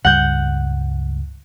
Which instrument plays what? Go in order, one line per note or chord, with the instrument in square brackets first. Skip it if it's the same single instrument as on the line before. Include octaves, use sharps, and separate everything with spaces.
[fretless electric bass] C#2 G2 G3 [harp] F#5 G6